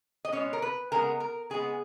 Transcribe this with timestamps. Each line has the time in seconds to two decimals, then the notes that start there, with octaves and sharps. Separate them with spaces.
0.25 D#5
0.32 B2 G#3 C#4 C#5
0.53 A#4
0.62 B4
0.92 C#3 G#3 B3 A#4
1.20 A#4
1.50 C#3 G#3 B3 G#4